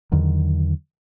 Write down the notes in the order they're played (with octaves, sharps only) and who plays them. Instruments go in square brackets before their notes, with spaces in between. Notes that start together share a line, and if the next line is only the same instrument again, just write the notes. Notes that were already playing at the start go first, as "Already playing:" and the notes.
[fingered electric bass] E2 D3 D#3 F#3